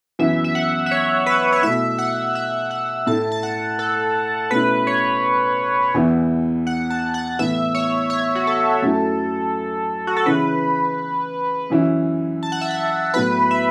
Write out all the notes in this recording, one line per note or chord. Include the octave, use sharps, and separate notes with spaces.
F#2 E3 B3 E4 E5
E5
F#5
E5
C#5
B4
C#5
B2 A3 E4 E5
F#5
E5
F#5
A2 A3 E4 A5
A5
F#5
A4
B2 A3 C#4 E4 B4
C#5
E2 E3 B3 E4
F#5
A5
F#5
A2 E3 B3 E4 E5
C#5
C#5
F#4
A4
F#2 F#3 A3 E4
F#4
A4
C#3 E3 C#4 E4 B4
F#2 E3 C#4 E4
A5
F#5
E5
F#5
A2 F#3 B3 E4 B4
E5